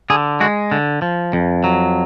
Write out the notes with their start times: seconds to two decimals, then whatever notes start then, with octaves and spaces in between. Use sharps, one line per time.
0.10 D3 G#4
0.40 G#3 F#4
0.72 D3
1.02 F3
1.33 F2
1.64 F#3